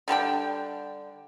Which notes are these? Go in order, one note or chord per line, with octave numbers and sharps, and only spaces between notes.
D3 G3 D4 G5